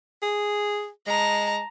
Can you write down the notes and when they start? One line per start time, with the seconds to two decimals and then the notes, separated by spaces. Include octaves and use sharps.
0.22 G#4
1.07 G#3 A5 A#5